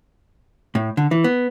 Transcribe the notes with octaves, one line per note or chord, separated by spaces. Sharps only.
A2
D3
E3
B3